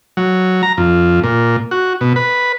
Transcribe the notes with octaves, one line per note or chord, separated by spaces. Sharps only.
F#3
A#5
F2
A#2
F#4
B2
B4